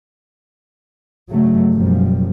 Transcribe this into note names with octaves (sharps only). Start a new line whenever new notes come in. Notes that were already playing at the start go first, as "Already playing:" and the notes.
G2 C#3 F#3 A3
F#1 F#2 B2 F3 G3